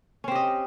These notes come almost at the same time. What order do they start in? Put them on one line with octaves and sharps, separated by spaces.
C#4 C4 G4 D#5